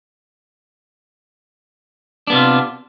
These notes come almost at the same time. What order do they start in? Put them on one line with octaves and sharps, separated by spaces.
D4 B3 C3 F4